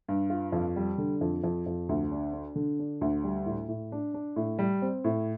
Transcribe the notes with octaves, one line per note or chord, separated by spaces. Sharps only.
G2
F4
F2
G3
D3
F2
F2
F2
D2
D4
D4
D3
D4
D2
G3
A2
A2
D4
D4
A2
G3
C4
A2